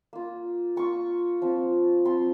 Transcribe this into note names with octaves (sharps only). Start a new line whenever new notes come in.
A#3 F4
A#3 F4 C#6
F3 C4 F4
F3 C4 F4 C6